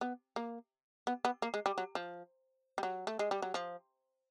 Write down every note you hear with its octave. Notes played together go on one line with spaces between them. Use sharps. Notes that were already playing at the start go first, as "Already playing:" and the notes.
B3
A#3
B3
B3
A#3
G#3
G3
F#3
F3
G3
F#3
A3
G#3
G3
F#3
F3